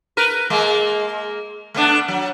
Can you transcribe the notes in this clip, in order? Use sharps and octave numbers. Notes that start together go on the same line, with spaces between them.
A#4 B4
G#3 A#3
A3 B3 D4
F#3